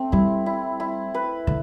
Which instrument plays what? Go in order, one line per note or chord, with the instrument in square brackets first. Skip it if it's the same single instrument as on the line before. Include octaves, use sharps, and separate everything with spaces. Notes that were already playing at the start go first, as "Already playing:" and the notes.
Already playing: [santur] A3 C4
[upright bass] G3 [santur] E4
[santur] E4
E4
B4
[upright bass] D3